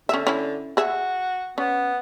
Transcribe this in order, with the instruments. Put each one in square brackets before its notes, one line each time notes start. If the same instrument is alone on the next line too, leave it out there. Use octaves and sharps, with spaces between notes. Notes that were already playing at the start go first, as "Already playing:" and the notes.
[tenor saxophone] D3 [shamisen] C#4 E5
[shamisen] C#4 E4
[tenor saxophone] F#4 [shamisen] G#4 E5
[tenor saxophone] B3 [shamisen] C#4